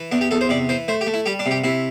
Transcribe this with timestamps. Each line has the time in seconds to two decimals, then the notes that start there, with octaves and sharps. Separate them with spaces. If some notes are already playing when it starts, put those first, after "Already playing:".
Already playing: E3
0.12 E2 D4
0.21 G4
0.31 E2 A4
0.41 C5
0.49 C3 D5
0.69 E3 C5
0.88 A3 C5
1.01 G4
1.06 A3
1.14 E4
1.26 G3 G4
1.39 D4
1.46 C3
1.51 G4
1.64 C3 E4